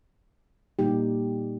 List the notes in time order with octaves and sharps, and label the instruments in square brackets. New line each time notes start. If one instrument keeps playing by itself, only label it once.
[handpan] A#2 G3 A#3 D#4 G4